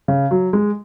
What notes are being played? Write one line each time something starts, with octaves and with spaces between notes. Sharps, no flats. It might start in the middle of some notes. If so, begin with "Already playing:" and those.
C#3
F#3
G#3